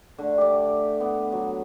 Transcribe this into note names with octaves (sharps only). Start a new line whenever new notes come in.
D3 A3
G4 D5
B3
F#3